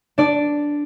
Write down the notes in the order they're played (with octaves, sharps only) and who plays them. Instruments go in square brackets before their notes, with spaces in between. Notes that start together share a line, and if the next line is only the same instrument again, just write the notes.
[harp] D4 D5